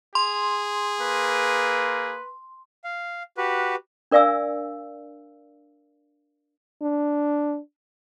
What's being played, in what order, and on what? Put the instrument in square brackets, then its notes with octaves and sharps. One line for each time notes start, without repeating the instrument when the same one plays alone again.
[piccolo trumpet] G#4 [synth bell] C6
[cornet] A#3 [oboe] B4
[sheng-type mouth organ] F5
F#4 G4 B4
[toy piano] D4 A#4 D5 F5 G#5 E6
[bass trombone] D4